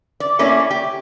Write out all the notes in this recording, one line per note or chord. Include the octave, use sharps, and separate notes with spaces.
D5
A3 A#3 C#4 E4 C#5 D5
G4